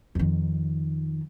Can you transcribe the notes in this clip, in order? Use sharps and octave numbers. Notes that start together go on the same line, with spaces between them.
F2 D#3